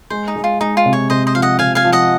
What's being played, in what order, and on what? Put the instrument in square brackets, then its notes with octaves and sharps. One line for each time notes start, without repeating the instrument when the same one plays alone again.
[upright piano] G#3 [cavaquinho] C5
[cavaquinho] D#4
[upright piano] G#3
[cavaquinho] F4
[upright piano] G#3 [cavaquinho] D#4
[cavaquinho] F4
[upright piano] C3
[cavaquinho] C#5
[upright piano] C3 [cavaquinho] C5 D#5
[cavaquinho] C5 D#5
[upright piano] F3 [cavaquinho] F5
[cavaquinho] D#5 F#5
[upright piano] C3 [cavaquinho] F5 G#5
[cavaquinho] F5 G#5
[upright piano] F3
[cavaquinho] D#5 F#5